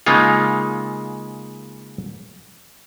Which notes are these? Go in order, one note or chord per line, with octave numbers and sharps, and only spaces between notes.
C#3 G#3 A#3 D#4 F4